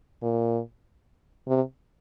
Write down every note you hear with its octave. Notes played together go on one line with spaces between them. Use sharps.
A#2
C3